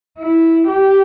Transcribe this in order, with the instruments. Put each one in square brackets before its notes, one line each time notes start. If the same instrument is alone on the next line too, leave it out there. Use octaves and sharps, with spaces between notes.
[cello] E4
G4